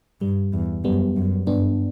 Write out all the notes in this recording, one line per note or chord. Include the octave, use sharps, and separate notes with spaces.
G2 G3
E2
F#2 G3 B3
F#2
G2 B3 D4